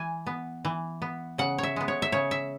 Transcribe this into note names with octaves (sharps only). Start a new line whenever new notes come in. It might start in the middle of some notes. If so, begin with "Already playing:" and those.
Already playing: E3 G#5
B3
E3
B3
C#3 F#5
C#5 E5
G#3 B3
C#5
E5
C#3 C#5
E5